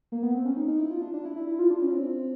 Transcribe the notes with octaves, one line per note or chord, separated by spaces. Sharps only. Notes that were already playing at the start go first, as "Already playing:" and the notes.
A#3
B3
C4
C#4
D#4
D#4
E4
F4
D4
D4
E4
E4
E4
F4
D4
C#4
C4